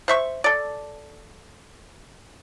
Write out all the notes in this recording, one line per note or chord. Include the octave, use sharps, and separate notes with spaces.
C5 E5 C#6
A4 D5